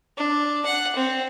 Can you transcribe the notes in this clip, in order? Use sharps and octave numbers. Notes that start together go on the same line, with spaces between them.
D4
F#5
C4